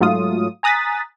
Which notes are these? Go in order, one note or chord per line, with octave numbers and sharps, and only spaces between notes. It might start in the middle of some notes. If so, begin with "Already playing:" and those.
G#2 F#3 A3 F4 D#6
G#5 A#5 D#6 F#6 A6 B6